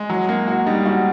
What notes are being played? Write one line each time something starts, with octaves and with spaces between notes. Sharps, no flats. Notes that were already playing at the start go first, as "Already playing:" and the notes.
Already playing: G#3
F#3
A#3
F#4
G3 D#4
G#3 F#4